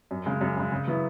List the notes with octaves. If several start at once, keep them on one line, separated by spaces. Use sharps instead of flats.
F#2
C#3 G#3
F#2
C#3 G#3
C#3
F#3 B3 E4